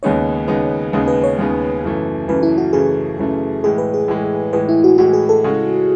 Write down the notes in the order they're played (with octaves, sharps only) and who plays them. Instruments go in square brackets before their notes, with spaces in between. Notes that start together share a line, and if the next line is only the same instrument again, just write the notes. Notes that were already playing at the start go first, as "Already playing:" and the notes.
[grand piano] D#2 C#3 G#3 B3 D#4 [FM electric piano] C#5
[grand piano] D#2 C#3 G#3 B3 D#4
D#2 C#3 G#3 B3 D#4
[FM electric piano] B4
C#5
[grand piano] D#2 C#3 G#3 B3 D#4
F#2 C#3 E3 A3
[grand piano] F#2 C#3 E3 A3 [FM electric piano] B4
[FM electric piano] E4
F#4
[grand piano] F#2 C#3 E3 A3 [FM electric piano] G#4
[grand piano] F#2 C#3 E3 A3
[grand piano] A2 E3 G#3 [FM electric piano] G#4
[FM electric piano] B4
G#4
[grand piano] A2 E3 G#3
[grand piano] A2 E3 G#3 [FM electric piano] B4
[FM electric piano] E4
F#4
[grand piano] A2 E3 G#3 [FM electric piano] F#4
[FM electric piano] G#4
A4
[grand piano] C#3 G#3 C#4 F#4